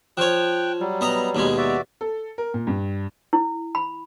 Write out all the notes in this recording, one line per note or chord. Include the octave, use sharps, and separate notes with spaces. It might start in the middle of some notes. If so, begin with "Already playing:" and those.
F3 C#5 G5 F#6
F#3 G3
B3 D#5 A#5
D#2 B2 G#3
F#4 D5 E5
A4
A#4
A#2
G2
E4
B5